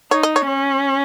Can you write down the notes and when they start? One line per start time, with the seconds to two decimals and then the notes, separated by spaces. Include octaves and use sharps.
0.11 D#4 C#5
0.23 D#5
0.36 C#5
0.47 C#4